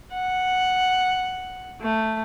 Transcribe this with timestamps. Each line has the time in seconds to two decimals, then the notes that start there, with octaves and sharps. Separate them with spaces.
0.13 F#5
1.81 A3